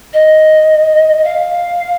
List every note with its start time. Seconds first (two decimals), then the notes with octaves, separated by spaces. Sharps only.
0.13 D#5
1.24 F5